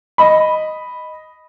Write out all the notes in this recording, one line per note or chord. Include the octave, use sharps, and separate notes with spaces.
D#5 B5